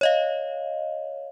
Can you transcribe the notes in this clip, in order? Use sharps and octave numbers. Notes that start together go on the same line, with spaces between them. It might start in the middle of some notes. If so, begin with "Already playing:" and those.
C#5 D#5 F5